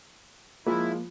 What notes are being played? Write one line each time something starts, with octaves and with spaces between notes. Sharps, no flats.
F3 G#3 A#3 E4 F4